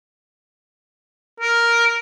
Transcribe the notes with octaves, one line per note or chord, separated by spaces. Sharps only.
A#4